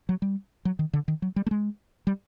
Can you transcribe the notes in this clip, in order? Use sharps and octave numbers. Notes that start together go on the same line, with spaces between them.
F#3
G3
F#3
D#3
D3
D#3
F#3
G3
A3
G#3
G3